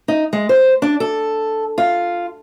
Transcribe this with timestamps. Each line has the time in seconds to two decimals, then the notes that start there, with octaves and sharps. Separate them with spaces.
0.08 D#4
0.33 G#3
0.49 C5
0.82 D4
1.00 A4
1.78 F4